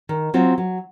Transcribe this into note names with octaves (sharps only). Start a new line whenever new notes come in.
D#3
F#3 C4 F4
F#3